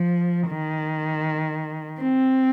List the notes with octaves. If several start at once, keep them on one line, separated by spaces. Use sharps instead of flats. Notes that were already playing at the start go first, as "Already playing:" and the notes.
Already playing: F3
D#3
C4